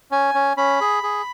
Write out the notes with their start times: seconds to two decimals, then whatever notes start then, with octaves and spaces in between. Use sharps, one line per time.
0.11 C#4 G#5
0.35 C#4
0.57 C#4 B5
0.81 G#4
1.03 G#4